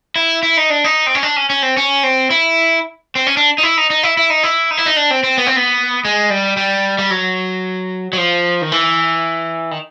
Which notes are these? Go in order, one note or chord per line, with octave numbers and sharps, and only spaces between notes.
E4
E4
D#4
D4
D#4
C4
C#4
D4
C#4
C#4
C4
C#4
C4
E4
C4
C#4
D4
D#4
E4
D#4
D#4
E4
E4
D#4
E4
D#4
E4
D#4
D4
C4
C4
B3
C4
B3
G#3
G3
G3
G3
F#3
F#3
F3
D#3
E3
D#3